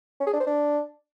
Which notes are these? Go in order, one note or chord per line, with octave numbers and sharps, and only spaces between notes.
C#4
G#4
D4
C5
D4